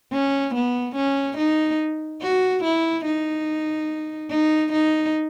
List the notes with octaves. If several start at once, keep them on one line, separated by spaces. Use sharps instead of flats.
C#4
B3
C#4
D#4
F#4
E4
D#4
D#4
D#4